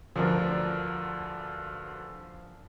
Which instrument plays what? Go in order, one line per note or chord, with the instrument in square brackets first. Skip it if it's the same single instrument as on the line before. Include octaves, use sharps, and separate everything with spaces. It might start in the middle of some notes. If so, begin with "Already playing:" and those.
[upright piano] D2 G2 D3 [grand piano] F3 D4 A#4